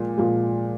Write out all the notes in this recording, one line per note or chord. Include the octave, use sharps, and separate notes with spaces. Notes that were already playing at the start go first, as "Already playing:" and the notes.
Already playing: A#2 F3 G#3
A#2 F3 G#3